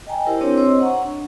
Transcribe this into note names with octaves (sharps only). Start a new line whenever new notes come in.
D#5 G5 G#5 A#5
E4 G4 A#4 C5
C4 D4 E4 G4 A#4 C#5
C4 C5 C#5 D#5 E6
F#5 A#5 C#6
D4